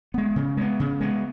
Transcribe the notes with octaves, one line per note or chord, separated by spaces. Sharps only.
G#3 B3
C#3
G#3 B3
C#3
G#3 B3